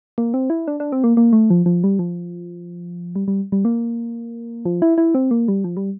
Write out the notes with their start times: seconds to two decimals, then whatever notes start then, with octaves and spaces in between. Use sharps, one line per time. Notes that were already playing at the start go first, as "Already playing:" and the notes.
0.18 A#3
0.34 C4
0.50 E4
0.68 D4
0.80 D4
0.92 C4
1.04 A#3
1.17 A#3
1.33 A3
1.50 F3
1.66 F3
1.84 G3
1.99 F3
3.16 G3
3.28 G3
3.52 G3
3.65 A#3
4.65 F3
4.82 E4
4.98 E4
5.15 C4
5.31 A#3
5.48 G3
5.64 F3
5.77 G3